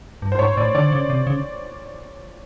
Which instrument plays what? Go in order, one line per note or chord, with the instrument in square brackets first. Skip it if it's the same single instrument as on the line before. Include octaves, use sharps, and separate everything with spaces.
[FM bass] G2
[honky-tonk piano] C5
[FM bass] G#2 [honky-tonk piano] C#5
[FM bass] A2 [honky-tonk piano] D5
[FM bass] D3 [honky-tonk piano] D5
[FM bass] C#3
C3
C#3